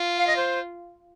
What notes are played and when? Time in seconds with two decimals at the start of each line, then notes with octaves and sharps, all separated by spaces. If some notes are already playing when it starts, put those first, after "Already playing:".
Already playing: F4
0.18 F5
0.27 D#5
0.36 C5